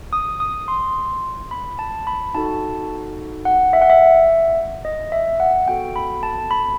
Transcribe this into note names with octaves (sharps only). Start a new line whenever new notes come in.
D#6
D#6
C6
B5
A5
B5
D#4 F#4 A4 A5
F#5
E5
F#5
E5
D#5
E5
F#5
B3 F#4 A4 G5
B5
A5
B5